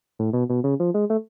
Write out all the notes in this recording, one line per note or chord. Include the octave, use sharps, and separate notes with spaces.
A2
B2
B2
C#3
F3
G#3
A3